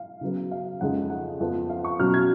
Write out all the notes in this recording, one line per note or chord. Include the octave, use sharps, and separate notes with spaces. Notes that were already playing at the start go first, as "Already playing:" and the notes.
Already playing: F5
C#3 F#3 B3
F5
F2 C#3 G#3 D#4 F#5
F#5
F2 F3 B3
F5
C#6
B2 F#3 C#4 F6
G#6